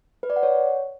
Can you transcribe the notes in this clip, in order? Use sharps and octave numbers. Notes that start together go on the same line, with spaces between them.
B4
D5
F#5
C#5